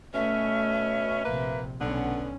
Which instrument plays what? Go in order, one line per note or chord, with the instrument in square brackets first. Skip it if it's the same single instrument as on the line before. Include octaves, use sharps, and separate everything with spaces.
[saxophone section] B2 C#4 [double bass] A3 [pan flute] E5
[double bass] A#1 C3 [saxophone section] A#3 B4
[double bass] B1 C#4 [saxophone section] D3 B3